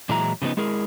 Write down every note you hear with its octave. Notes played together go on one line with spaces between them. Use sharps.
A#2 E3 F#3 G#3 E4 A#5
C#3 F3 F#3 B3 D#4
G#3 E4 G#4 A#4